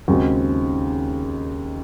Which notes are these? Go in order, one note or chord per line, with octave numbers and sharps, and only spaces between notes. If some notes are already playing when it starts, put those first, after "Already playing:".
D#2 C#3 G#3 C4 F#4